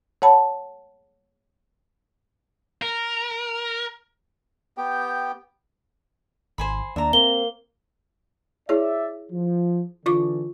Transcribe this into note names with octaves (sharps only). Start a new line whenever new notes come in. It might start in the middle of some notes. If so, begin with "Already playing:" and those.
C#5 F#5 A5 B5
A#4
B3 G4 G5
G#1 C5 G#5 B5
D#2 D4 E5 A#5
A#3 C4 G7
E4 G#4 C#5 D5 E5
F3
D3 E3 F4 C#6 D6